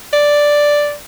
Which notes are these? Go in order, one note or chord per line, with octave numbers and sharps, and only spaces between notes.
D5